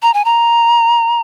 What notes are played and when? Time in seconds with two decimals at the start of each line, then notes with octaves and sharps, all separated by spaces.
0.03 A#5
0.14 G#5
0.25 A#5